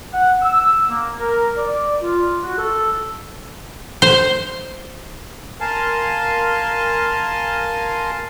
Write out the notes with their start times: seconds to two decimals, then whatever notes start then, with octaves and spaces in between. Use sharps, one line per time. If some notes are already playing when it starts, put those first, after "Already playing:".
0.14 F#5
0.42 E6
0.90 A#3
1.19 A#4
1.57 D5
2.02 F4
2.44 F#4
2.58 A4
4.02 C5
5.61 A#4 F5 G#5 A5 C6